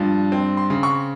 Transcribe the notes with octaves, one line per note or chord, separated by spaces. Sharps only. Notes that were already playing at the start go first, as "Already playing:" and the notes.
Already playing: G2 F3
C4
C6
C#3
C#6